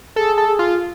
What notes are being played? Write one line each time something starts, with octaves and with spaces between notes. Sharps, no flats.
G#4 A4
A4
G#4
F4